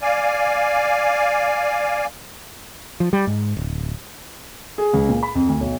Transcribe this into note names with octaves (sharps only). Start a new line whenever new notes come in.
D5 F5 G#5
F3
G3
G#2
D1
G#4
C#2
A#2
B5
F2
D2
B1